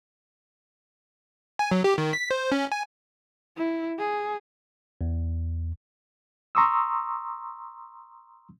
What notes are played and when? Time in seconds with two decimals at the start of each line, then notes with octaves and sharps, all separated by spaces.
1.59 G#5
1.71 F#3
1.84 G4
1.98 D#3
2.13 B6
2.31 C5
2.52 C#4
2.72 G#5
3.57 E4
3.98 G#4
5.01 E2
6.55 A#5 C6 C#6 D#6 E6